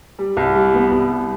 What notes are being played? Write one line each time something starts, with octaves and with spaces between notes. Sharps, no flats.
G3
C2
G3
B3
C2
G3